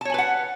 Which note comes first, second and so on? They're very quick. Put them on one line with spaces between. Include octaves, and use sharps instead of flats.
A5 C#5 G#5 B4 F#5